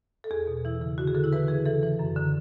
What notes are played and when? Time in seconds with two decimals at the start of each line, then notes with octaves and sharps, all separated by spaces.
0.24 A4
0.31 E2 G#4
0.47 B2
0.65 E3 E4
0.81 C#3
0.98 D3 F#4
1.07 G#4
1.15 D3 A4
1.24 E4
1.33 E3 B4
1.48 C#3 G#4
1.66 E3 A4
1.83 E3
1.99 F#2
2.16 D3